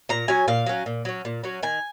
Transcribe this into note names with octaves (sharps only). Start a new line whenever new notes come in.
A#2 A#5
F#3 C#4 G#5
A#2 F5
F#3 C#4
A#2
F#3 C#4
A#2
F#3 C#4
D#3 G#5